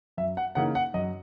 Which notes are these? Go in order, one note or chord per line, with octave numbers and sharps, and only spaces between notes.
F#2 E5
F#5
C#3 E3 A#3 D#4 F#5
F#5
F#2 D#5